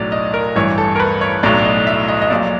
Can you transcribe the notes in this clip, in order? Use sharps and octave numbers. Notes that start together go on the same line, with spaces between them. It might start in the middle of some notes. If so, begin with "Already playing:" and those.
Already playing: B1 A2 F#3 D5
D#5
A#4
A1 G2 E3 C#5
A4
A#4
B4
C#5
B1 A2 F#3 D5
D#5
E5
D#5
D#5
A#1 A#2 F#3 D5